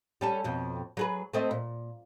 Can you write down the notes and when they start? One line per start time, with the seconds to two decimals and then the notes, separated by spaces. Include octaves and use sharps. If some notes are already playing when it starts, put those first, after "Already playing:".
0.21 G3 C#4 A4
0.44 F2 B2
0.97 F#3 G#4 B4
1.34 A3 C4 D#5
1.51 A#2